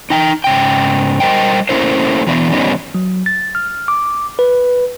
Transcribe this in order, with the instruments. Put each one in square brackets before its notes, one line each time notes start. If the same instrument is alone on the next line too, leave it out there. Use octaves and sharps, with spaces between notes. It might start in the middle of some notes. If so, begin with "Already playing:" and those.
[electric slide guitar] D#4 G5 G#5 A#5
G#2 C#3 G5
G3 A#4 C5 D#5 G5
A3 A#3 C#4 E4 A#4 C5
E2 B2 E3 B3 D4 E4
D#3 G3 B3 C#4 D#4
[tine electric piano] F#3
A6
F6
D6
B4